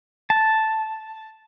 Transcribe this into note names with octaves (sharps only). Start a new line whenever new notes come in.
A5